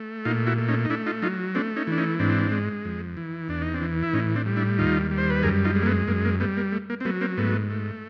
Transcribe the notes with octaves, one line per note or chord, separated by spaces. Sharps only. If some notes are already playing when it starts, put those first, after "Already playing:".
Already playing: A3
A#2 D#4 F4
E4 F#4
A3
C#4 D#4
D#4
A3 D4 E4
D#4 F4
F#3 D#4 F4
A3 C4 D4
C#4 D#4
E3 D4
C#4 D#4
G#2 C4 D4
G#3
F2
E3
E2 D4
D#4
C4 D4
E3
E4
A2 C#4 D#4
C4 D4
G3
D4 E4
D#2 D#4 F4
G3
C5
B4
F#2 G#4 A#4
D#4 F4
G#3
A#3
A3 B3
F#2 A#3
A#3
G3 A3 B3
A#3
A3
A#3
C4
F#3 A3 B3
A#3 C4
G#2 A3 B3
A3